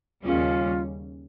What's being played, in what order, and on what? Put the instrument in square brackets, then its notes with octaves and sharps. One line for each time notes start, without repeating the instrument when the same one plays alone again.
[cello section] D#2 C#3 G3 C#4 [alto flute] F4